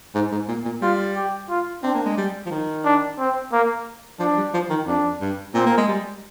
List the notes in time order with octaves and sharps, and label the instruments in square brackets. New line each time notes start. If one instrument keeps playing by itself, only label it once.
[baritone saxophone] G#2
G#2
A#2
A#2
[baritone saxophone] G3 [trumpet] F4
[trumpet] G4
F4
[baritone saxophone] C4 [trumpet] D4
[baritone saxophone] A#3
G#3
G3
F3
D#3
[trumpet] D4
C4
A#3
[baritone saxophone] F3 [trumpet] D4
[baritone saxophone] G3
F3
D#3
[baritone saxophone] F2 [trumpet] D4
[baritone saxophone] G2
[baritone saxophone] A#2 [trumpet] C4
[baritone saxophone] A#3
G#3
G3